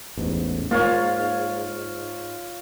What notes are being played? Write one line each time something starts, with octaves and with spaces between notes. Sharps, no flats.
A1 E2 G#2
G#2 A#3 F4 C#5